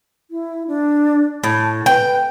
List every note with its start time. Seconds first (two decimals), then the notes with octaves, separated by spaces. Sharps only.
0.31 E4
0.68 D4
1.44 A2 A5
1.86 B4 G5